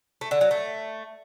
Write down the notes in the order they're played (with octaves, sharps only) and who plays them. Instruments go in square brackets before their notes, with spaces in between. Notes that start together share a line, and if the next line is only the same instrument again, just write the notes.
[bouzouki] A3
D3
F#3
A3